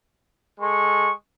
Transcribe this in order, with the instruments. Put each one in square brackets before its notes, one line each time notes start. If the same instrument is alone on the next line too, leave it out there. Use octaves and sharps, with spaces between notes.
[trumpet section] G#3 A4 C#6